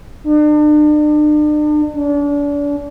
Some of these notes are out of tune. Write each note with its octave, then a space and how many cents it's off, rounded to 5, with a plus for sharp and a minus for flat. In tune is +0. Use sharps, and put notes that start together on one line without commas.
D4 +40
D4 -35